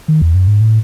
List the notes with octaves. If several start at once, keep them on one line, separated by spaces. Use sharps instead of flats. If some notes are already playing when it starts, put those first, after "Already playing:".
D#3
E2
F#2
G#2
A2